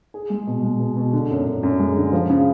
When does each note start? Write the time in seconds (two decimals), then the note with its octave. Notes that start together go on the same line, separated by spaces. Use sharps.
0.14 G#4
0.30 G#3
0.47 B2
0.63 G#3
0.80 B2
0.97 B2
1.13 D3
1.31 F#2
1.47 F#2
1.63 F#2
1.79 G#3
1.97 D3
2.13 F3
2.30 C#3